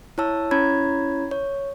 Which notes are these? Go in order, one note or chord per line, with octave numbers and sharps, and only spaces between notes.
E4 C#5 A5 E6
C#4 E4 C#5 A#5 B5 G#6
C#5